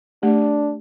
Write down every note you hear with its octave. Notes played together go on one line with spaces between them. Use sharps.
A3 D4 G4